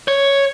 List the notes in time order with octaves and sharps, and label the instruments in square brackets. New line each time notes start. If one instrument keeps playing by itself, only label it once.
[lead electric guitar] C#5